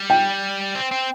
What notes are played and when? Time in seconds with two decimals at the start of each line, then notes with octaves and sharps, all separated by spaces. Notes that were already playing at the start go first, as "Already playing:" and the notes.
Already playing: G3
0.10 G5
0.75 C4
0.91 C4